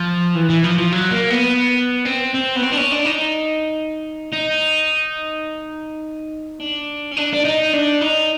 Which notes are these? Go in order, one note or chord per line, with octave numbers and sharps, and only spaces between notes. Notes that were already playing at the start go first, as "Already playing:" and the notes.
Already playing: F3
E3
E3
F3
F3
F#3
A#3
B3
C4
C4
B3
C4
D4
C#4
D4
D#4
D#4
D4
C#4
D4
D4
D#4
D4
D#4